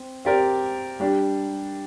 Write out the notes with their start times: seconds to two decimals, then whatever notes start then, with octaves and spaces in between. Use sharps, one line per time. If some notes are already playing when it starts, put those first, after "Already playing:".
Already playing: C4
0.25 C4 G4 A#4 D5
1.00 G3 D4 G4